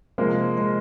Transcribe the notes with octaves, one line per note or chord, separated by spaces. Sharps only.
C3 F3 G#3 A#3
G#3